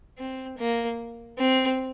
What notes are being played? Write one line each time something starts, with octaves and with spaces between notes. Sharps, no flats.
C4
A#3
C4